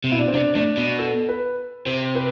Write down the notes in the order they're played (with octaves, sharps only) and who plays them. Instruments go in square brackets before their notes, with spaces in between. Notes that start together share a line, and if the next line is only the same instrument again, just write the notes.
[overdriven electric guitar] C3
[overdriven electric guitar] B2 [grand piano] E4
[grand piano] D4
C4
[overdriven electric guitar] C3 [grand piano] D4
[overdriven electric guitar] A2 [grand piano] D4
[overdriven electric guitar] B2
[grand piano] A4
B4
[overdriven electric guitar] C3 [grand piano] C5
[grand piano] B4